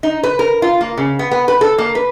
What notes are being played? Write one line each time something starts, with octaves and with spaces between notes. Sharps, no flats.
D#4
B4
A#4
F4
A#3
C#3
B3
B3
B4
A4
A#3
B4